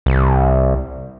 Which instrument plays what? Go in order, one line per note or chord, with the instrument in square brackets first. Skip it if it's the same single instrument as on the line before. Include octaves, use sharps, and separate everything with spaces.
[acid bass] C2